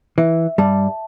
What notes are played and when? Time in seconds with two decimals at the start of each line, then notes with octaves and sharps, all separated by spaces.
0.18 E3 E5
0.58 G2 G3 A5